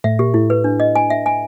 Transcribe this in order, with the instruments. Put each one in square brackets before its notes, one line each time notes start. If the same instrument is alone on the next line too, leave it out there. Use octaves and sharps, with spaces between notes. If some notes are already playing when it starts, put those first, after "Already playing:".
[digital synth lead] A2 [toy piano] E5
[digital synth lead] A#2 [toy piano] G4
[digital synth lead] A2 [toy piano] E4
[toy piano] B4
D4
D#5
G#5
E5
G#5